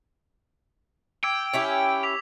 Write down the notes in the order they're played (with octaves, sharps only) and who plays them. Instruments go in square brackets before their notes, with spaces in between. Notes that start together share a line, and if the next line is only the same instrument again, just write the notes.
[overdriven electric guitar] G5 [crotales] D6 E6 G#6
[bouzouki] C#4 E4 G4
[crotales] D6 B6 F7